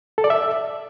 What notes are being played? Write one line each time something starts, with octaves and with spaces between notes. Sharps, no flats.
A4
D5
E5